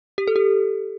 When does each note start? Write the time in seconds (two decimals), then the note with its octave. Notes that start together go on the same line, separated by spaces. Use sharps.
0.18 G4
0.27 A4
0.36 G4